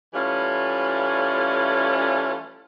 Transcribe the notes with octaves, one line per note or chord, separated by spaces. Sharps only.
E3 G3 A3 C#4 F4